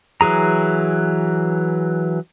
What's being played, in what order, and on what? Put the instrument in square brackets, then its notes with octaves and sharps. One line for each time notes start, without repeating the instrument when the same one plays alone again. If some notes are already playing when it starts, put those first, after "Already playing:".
[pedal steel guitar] E3 F#3 G#4 A#5